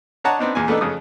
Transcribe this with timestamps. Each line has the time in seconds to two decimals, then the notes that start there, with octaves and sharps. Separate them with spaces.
0.24 D4 C#5 D#5 F#5 A5 A#5
0.39 B3 C4 D4 D#4
0.55 E2 A#2 G#5
0.68 A3 B3 D4 D#4 A4
0.81 F2 C#3 A3 D#6